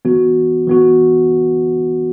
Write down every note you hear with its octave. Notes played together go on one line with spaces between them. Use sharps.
E3 B3 F#4
E3 B3 F#4